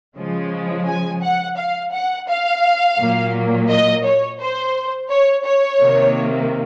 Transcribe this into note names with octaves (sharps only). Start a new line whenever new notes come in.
C#3 F3 G#3
G#5
F#5
F5
F#5
F5
A#2 F#3 A#3
D#5
C#5
C5
C#5
C#5
C3 D#3 A#3